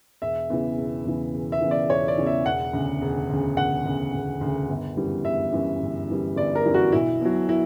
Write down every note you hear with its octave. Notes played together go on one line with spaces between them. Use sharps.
E1 E5
E2 C#3 E3
E1
E2 C#3 E3
E1
E5
E2 C#3 E3
D5
E1 C#5
D5
E2 C#3 E3
E5
E1 F#5
D2 C#3
E1
D2 C#3
E1 F#5
D2 C#3
E1
D2 C#3
G1
F#2 E3 G3
G1 E5
F#2 E3 G3
G1
F#2 E3 G3
G1 D5
A#4
F#2 E3 G3
F#4
B1 E4
B2 F#3
E4